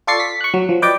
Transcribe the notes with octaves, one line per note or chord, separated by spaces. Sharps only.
F4 A4 D5 C#6 A6 C7
B6
C#6 F#6
F#3
F3
B4 D5 D#5 G5 D6